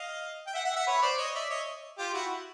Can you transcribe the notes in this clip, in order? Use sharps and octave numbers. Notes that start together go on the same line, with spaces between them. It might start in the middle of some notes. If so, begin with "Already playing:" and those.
Already playing: D#5 F5
G5
E5 F#5
E5 F#5
E5 F#5
B4 C#5
C5 D5
C#5 D#5
D5 E5
C#5 D#5
F4 G4
E4 F#4